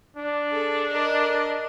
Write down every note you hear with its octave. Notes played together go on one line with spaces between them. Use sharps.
D4
G#4 A4
A#4 D#5